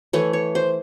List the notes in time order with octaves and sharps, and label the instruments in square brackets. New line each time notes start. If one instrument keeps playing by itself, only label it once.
[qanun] E3 A3 C#5
C#5
C5